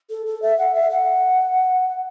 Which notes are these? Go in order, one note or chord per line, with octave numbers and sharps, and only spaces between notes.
A4
A4
E5
F#5
E5
F#5